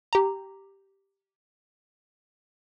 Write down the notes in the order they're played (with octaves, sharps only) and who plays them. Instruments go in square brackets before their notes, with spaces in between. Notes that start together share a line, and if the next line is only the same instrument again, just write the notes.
[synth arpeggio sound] G4 A#5